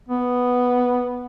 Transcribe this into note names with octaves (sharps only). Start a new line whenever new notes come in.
B3